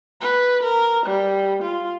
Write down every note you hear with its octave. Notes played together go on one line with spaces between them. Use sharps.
B4
A#4
G3
F4